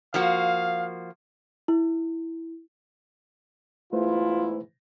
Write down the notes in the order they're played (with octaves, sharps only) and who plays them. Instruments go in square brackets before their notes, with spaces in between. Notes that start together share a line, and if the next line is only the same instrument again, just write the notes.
[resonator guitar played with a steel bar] F3 A#3 F#4 [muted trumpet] F5
[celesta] E4
[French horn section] E2 G#2 E4 [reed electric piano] A3 B4 C5 [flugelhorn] F4